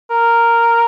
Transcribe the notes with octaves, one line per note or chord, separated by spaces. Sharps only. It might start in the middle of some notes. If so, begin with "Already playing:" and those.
A#4